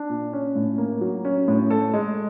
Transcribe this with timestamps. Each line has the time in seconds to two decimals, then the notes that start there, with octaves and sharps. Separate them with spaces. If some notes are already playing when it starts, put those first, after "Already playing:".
Already playing: D4
0.09 A#2
0.33 C#4
0.55 A2
0.78 A#3
1.01 F#3
1.25 C#4
1.48 A2
1.70 A4
1.94 G#3